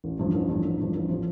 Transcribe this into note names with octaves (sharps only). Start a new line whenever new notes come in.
A1
G2 F3
A1
G2 F3
A1
G2 F3
A1
F3